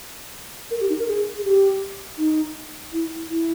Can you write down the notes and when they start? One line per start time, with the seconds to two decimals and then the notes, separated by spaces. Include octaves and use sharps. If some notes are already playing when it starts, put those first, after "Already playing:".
0.71 A#4
0.80 G4
0.89 D#4
0.99 A#4
1.08 G#4
1.38 G#4
1.44 G4
2.18 D#4
2.93 E4
3.29 E4